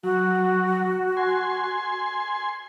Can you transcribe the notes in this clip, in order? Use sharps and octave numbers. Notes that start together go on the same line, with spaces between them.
F#3 F#4
G#5 C6